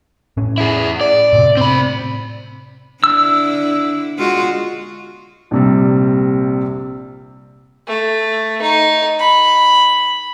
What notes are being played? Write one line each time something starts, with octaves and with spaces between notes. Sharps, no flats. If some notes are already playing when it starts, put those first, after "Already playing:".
A2 C#4
E4 G#4
D5
A2 C3
C4 B5
D3 D4 E4 E6
G#3 F4 F#4
A#1 C3 G3
A3
D#4
B5